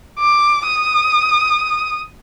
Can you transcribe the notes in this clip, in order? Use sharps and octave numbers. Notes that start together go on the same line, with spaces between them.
D6
D#6